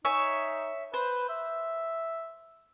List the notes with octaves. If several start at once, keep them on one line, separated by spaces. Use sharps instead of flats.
D#4 C#5 E5 G#5
B4 C5
E5